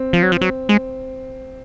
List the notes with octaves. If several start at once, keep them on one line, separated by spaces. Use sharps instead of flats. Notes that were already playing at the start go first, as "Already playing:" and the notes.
Already playing: C4
F3
F#3
F3
F#3
G#3